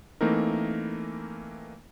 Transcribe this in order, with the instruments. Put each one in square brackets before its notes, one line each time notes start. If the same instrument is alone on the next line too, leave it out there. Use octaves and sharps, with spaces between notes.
[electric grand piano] E3 A3 A#3 C4 D#4 A#4